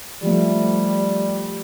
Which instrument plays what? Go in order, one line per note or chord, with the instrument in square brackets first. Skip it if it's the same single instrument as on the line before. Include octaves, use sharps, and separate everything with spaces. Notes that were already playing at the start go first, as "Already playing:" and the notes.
[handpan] F3 A3 [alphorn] G3